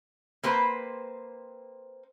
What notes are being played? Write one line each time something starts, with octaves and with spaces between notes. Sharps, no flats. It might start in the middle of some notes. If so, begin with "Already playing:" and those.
A#3 C4 B4 C5